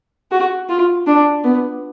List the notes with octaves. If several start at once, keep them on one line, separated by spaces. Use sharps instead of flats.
F#4
F4
D4
B3